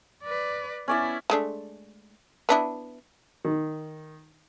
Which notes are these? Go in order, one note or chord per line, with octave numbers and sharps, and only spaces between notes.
B4 D5
B3 C#4 E4 D5 E5
G#3 A3 D4
B3 D4 E4
D#3